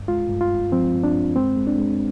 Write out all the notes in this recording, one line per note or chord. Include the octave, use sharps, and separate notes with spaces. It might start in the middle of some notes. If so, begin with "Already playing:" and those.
Already playing: G2
G#3 F4
G2
F4
G2
F3 C4
G2
D4
G2
G#3 C4
G#3
D4
G#3